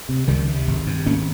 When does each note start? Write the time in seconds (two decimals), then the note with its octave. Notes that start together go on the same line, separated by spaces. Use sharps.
0.09 C3
0.28 C#2 D#3 G3
0.48 C3
0.68 G#1
0.87 G2
1.06 G#1 A#3 C#4